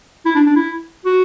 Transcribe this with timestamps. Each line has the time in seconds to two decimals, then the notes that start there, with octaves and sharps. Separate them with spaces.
0.26 E4
0.35 D4
0.46 D4
0.56 E4
1.05 F#4